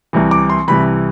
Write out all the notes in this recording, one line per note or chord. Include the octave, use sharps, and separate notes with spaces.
C2 C3 E3
D6
C6
C2 C3 E3 B5